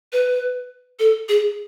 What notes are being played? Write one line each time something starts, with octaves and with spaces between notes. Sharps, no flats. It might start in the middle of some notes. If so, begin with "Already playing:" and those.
B4
A4
G#4